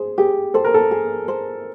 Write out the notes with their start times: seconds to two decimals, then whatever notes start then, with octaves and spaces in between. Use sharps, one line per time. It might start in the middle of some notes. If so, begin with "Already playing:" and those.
Already playing: G#4 C5
0.18 G4 G#4
0.54 A4 C5
0.64 A#4
0.74 A4
0.91 G#4
1.28 C5